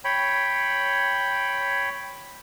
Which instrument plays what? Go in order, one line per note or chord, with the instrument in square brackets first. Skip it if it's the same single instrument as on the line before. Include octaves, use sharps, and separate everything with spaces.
[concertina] C#5 G5 B5